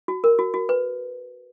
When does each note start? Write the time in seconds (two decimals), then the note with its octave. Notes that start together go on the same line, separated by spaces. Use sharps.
0.08 F#4
0.24 A#4
0.39 F#4
0.54 F#4
0.69 B4